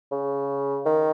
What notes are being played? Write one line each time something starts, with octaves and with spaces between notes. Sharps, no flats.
C#3
D#3